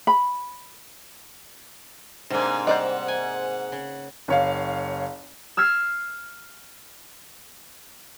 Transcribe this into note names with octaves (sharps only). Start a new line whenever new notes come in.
B5
G#2 C3 A#3 D4 G#5
G3 C5 D5 D#5 F#5
G#5
C#3
F#1 C#5 F5
E6 F6 G#6 C7